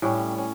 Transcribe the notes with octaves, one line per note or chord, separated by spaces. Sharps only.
A2 G3 C#4
C#4